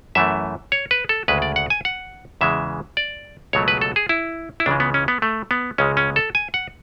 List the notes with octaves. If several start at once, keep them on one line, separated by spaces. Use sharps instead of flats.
F#2 E3 A3 E5
C#5
B4
A4
D2 C#3 G#3 B4
D5
F#5
G#5
F#5
E2 C#3 E3 G#3 E5
D5
C#2 B2 F#3 A3 C#5
B4
A4
G#4
E4
E4
C#2 C#3 E3 G#3 D4
B3
C#4
B3
A3
B3
C#2 C#3 G#3 C#4
C#4
A4
G#5
F#5